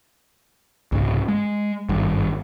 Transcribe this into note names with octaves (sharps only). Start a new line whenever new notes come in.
C2 G#2 C#3
G#3
G#1 G2